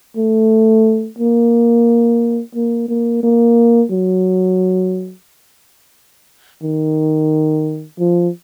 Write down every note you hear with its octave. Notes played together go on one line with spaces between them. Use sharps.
A3
A#3
A#3
A#3
A#3
F#3
D#3
F3